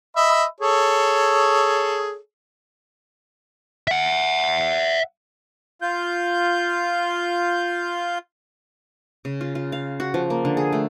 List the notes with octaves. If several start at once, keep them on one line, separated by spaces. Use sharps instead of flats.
D#5 E5 B5
G#4 A4 C#5
E5 F#5
F4 G6
C#3
F4
F4
F5
F#4
F3
A#3
D3
G#4
A3